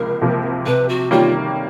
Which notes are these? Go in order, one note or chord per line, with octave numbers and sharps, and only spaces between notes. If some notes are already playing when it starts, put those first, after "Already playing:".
Already playing: C#2 C3 F3 A#3 A#4
C3 F3 A#3
C3 B4
F#4
D#3 G3 A#3 C#4 F4